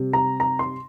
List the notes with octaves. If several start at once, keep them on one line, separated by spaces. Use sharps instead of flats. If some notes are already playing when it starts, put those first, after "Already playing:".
Already playing: C3 G3
A#5
A#5
C6